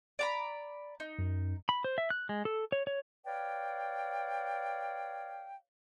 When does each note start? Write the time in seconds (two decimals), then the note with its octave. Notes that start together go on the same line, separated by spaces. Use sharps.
0.19 D5 A#5 B5
1.00 D#4
1.18 F#2
1.69 B5
1.84 C5
1.98 E5
2.10 F#6
2.29 G#3
2.45 A4
2.72 C#5
2.87 C#5
3.25 B4 C#5 D5 F5 G5